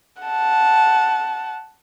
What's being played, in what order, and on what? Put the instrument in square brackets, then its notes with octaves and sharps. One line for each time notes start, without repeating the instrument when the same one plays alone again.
[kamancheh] F#5 A5